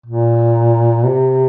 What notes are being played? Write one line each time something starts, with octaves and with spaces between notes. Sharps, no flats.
A#2
C3